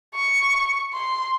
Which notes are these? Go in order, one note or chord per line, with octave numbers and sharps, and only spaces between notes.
C#6
C6